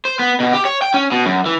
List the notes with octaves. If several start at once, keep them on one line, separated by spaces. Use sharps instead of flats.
C5
B3
B2
G4
C#5
G5
C#4
B2
F#2
E3